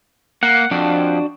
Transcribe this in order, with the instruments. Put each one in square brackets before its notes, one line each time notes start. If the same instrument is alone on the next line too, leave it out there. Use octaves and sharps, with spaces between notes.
[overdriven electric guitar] A#3 [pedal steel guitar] F#5
[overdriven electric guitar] F2 [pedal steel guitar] D4 F#4